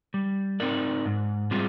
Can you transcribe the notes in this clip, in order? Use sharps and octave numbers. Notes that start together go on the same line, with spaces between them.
G3
C4 D#4 A#4 D5
G#2
G3 C4 F4 G#4